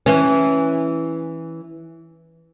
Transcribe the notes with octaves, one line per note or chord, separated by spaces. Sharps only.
E3 C#4